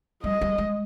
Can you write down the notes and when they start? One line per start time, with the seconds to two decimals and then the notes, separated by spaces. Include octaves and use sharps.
0.24 G3 D#5
0.41 G3
0.58 G#3